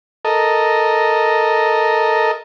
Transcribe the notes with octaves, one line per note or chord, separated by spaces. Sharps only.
A4 A#4 D#5